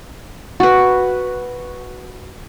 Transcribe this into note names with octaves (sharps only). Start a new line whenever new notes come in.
F#4 B4